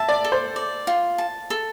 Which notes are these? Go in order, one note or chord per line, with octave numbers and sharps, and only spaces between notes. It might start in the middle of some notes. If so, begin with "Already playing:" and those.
Already playing: E5 A5
D5
A4
C5
D5
F4
A5
A4